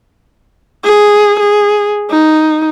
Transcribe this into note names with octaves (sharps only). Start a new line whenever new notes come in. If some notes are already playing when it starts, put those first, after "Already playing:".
G#4
G#4
D#4